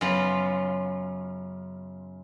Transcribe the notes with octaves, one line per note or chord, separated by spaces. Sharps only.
F#2 C#3 B3 F4 B5